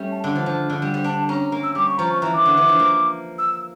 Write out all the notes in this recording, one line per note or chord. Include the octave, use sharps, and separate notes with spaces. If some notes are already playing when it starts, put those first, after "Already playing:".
Already playing: G3 A3 C#4
A5
D3
F3
F3
D3
G3
G3
D4 A5
C#4 A#5
A#3
E6
G3 D6
C#6
F3 A#5
C#6
E3 A#5
D6
D3
E3
F3
A#3
E6